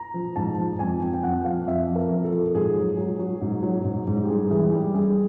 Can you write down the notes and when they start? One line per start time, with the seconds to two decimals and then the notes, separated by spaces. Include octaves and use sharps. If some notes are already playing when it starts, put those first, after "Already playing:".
Already playing: A#5
0.14 F3
0.36 G#2 A5
0.58 F3
0.79 F2 G#5
1.01 F2 G5
1.13 G5
1.23 F2 F#5
1.45 F3 F5
1.66 F2 E5
1.88 F2
1.96 A#4
2.10 F3
2.25 A4
2.32 F3
2.55 G#2 G#4
2.75 F#3
2.97 F#3
3.19 F#3
3.42 G#2
3.63 F#3
3.85 G#2
4.07 G#2
4.24 G4
4.29 G2 G#4
4.51 E3 G#4
4.72 G3 G4
4.94 G2 G#4